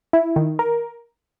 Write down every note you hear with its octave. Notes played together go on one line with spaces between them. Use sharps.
E4
D#3
A#4